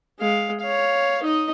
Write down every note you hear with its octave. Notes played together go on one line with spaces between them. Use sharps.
G#3 F5
C#5 F5
D#4 D#5